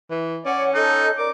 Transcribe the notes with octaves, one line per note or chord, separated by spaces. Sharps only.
E3
C#4 C#5 D5 F#5
D#4 A4 D#5
A#4 D5 D6